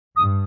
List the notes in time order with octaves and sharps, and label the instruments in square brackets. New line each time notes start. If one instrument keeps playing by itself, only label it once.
[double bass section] G2 [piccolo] D#6